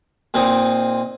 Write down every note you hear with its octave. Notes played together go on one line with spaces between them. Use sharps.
A#2 C4 D#4